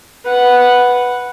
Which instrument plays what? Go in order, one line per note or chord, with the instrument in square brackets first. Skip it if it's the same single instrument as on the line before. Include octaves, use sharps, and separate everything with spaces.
[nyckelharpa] B4 F#5